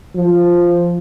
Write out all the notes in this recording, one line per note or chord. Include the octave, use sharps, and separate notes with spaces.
F3